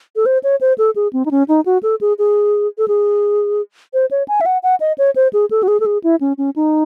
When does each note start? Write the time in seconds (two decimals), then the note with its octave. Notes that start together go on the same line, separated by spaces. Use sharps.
0.16 A4
0.26 C5
0.44 C#5
0.61 C5
0.78 A4
0.96 G#4
1.13 C4
1.26 D#4
1.31 C#4
1.48 D#4
1.66 F#4
1.83 A4
2.01 G#4
2.19 G#4
2.78 A4
2.88 G#4
3.94 C5
4.11 C#5
4.28 G#5
4.41 E5
4.46 F#5
4.63 F#5
4.80 D#5
4.98 C#5
5.16 C5
5.33 G#4
5.51 A4
5.63 F#4
5.68 G#4
5.80 A4
5.86 G#4
6.04 E4
6.21 C#4
6.38 C#4
6.56 D#4